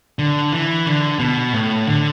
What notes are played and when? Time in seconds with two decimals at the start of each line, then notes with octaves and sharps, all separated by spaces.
0.19 D3
0.53 E3
0.86 D3
1.19 B2
1.53 A2
1.87 D3